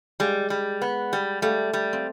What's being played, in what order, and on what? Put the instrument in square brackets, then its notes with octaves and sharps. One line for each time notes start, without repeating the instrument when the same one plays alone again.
[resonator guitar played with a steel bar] G3 [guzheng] G#3
[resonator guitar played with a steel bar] G3
B3
G3
[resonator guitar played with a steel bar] G3 [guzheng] A3
[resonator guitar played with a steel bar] G3
[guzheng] C4